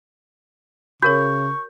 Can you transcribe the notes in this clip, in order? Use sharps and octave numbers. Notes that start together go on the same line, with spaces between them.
C#3 F#4 A#4 C#5 C#6 G6